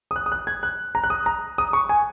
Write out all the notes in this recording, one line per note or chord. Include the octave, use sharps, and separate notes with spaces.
D#6
F#6
D#6
F#6
G#6
F#6
A#5
F#6
D#6
A#5
D#6
C#6
G#5